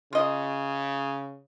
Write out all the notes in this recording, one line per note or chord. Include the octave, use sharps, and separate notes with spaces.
C#3 F4 D#5